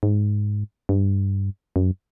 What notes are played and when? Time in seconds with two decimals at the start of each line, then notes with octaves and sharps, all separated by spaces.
0.03 G#2
0.89 G2
1.76 F#2